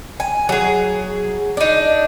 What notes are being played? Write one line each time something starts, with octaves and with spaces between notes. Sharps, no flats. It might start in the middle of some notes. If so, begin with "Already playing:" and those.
G#5
F#3 G#4
D4 D#4